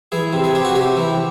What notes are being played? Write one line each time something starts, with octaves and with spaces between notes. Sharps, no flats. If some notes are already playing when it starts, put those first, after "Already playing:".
E3 G#4
C3
G#4
C3 G4
F#4
C3 G4
E3